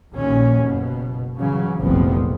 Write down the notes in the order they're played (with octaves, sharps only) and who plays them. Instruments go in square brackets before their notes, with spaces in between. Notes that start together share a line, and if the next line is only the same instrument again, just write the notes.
[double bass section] A#1 D#2 A#2 C#4
F#1 B2
C#3 E3 F#3
F1 A#1 E2 F3 B3 C4